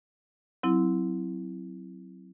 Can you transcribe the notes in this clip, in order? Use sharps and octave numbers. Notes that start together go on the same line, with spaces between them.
F#3 C4 E4